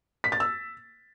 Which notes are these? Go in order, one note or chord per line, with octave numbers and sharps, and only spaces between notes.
B6
A6
E6